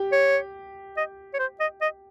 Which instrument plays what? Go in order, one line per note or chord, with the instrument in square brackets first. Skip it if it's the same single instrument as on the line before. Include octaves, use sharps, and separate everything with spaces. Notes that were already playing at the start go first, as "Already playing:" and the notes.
Already playing: [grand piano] G4
[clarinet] C#5
D#5
C#5
C5
D#5
D#5